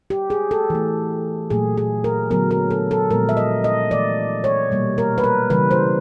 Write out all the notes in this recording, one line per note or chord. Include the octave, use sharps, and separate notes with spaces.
G4
G#4
A4
E3 A3
A#2 F#3 A3 G#4
G#4
A#4
D3 F#3 B3 A#4
A#4
A4
A4
A#2 F3 G#3 B3 A#4
E5
D#5
D#5
E3 A3 D5
C#5
B2 G3 A#3
A#4
B4
A#4
C#3 E3 G3 B4
C5